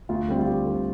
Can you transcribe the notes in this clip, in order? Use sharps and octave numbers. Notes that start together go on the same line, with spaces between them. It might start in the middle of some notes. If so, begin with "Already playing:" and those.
D2 F4
D3 G3 C4
F4
D2 G4
D3 G3 C4